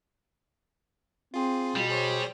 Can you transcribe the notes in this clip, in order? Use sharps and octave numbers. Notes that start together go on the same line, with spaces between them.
C4 F4 G#4
B2 G3
G#4 C5 C#5